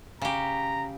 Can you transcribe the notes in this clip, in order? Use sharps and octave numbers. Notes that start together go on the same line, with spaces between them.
C#3 G4 A#5